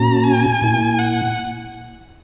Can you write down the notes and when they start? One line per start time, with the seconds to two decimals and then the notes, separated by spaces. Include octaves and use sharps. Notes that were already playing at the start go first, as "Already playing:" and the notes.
Already playing: A#2 A#3 C#4 F#4 A#5
0.23 G#5
0.62 A#2 A#3 E4
0.98 F#5